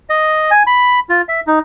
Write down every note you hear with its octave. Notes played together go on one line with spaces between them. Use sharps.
D#5
G#5
B5
F4
E5
D#4